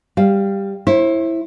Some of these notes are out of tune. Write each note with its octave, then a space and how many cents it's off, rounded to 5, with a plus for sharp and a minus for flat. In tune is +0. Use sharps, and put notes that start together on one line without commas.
G3 +10 F5 +0
E4 +0 C5 +40